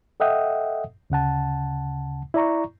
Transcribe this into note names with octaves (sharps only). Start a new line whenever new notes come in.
A4 D#5 E5 F#5 G5 D#6
D2 C#3 F#5 A5
E4 D5 A#5 C#6